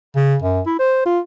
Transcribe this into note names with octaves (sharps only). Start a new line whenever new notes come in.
C#3
F#2
E4
C5
F4